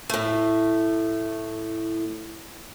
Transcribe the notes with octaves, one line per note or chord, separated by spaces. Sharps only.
A2 A3